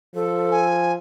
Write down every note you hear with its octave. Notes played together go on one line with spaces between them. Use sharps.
F3 A4
G#5